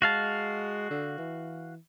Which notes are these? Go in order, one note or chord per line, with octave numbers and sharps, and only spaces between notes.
G#3 F#4 F5 A5
D3
E3